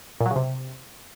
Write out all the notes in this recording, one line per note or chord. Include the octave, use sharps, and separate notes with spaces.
A#2
F#3
C#3
C3